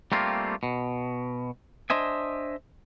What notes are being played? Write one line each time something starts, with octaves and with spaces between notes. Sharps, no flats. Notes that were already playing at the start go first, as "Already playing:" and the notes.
G3 A3 A#3 C4 F4
B2
D4 C5 D#5 E5 G#5